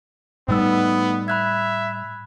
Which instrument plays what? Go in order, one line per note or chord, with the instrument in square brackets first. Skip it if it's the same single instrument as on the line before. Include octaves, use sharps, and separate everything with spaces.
[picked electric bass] A2 G3 [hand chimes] A3 D#4 E6 [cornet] B3
[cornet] E5 [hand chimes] B5 F#6 G#6